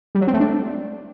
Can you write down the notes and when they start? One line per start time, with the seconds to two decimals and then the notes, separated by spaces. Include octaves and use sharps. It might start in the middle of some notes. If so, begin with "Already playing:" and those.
0.15 G3
0.21 F#3
0.27 C4
0.34 A3
0.40 D4